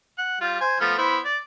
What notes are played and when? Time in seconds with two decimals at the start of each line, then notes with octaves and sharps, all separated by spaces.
0.18 F#5
0.41 G3 F4
0.61 C5 G#5
0.80 F3 A3 B3
0.98 B3 E4 C5
1.25 D5